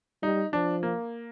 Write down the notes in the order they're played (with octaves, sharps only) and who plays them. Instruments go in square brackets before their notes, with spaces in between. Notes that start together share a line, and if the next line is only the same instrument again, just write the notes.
[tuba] G3 [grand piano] D#4
[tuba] F3 [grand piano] D4
[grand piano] A#3